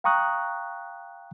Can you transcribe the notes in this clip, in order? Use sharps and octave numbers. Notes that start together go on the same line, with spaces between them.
F5 G5 A#5 C#6 D#6 F#6